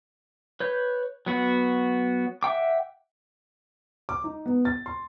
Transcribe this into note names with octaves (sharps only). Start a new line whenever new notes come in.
B4 C#5 G6
F#3 B3 F#4
E5 F#5 G5 D6
D6
D#4
B3
A6
C6